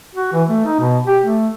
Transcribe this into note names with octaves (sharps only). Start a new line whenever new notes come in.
F#4
E3
A3
D#4
B2
G4
A3